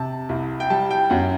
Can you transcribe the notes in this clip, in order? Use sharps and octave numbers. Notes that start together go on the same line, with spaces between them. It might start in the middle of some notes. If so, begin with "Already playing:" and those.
Already playing: C3 A5
C2
G5
G3 A5
G5
F#2 F#5